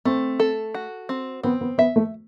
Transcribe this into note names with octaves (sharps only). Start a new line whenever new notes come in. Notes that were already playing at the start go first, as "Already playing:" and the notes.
A3 C4
A4
F#4
C4
B3 C4
B3
B3 E5
A3